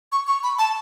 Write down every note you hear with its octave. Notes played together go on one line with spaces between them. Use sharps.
C#6
C#6
B5
A5